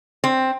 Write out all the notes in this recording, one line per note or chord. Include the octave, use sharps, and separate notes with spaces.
C4